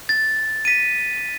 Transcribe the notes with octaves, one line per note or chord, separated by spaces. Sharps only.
A6
B6 D#7